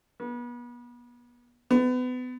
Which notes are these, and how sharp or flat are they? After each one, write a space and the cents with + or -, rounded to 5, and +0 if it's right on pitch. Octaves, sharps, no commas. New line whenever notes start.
B3 -35
B3 +30